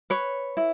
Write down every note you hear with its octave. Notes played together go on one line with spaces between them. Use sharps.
B4 C#5
E4